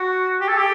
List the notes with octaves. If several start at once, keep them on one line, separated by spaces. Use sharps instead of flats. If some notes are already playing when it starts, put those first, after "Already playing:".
Already playing: F#4
G4
A4
G4